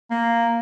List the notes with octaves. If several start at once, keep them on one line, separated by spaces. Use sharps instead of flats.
A#3